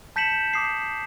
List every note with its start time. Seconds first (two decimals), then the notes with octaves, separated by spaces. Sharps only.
0.16 A5 G6 B6 C#7 E7 F#7
0.53 D6 D#6 C7